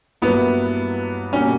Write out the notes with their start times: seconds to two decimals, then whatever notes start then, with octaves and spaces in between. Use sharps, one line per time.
0.22 G2 F#3 A#3 B3 E4 B4
1.33 B2 G3 A#3 C#4